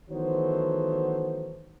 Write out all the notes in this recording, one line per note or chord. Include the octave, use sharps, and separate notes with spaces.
D#3 E3 F#3 A3 B3 C5